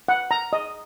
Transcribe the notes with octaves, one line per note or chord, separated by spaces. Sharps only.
F#5
A#5
D#5